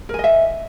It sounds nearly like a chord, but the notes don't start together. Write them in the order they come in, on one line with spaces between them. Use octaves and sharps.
A#4 G#5 D#5 E5